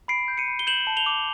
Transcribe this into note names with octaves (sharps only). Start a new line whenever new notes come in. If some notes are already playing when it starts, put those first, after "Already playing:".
B5 C7 D7
G6
C#7 D#7
B5
G7
G6 E7 F#7
A5
F7 G7
D6